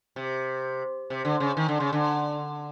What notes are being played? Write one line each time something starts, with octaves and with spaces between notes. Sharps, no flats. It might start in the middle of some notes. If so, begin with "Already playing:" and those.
C3
C3
D3
C#3
D#3
D3
C#3
D3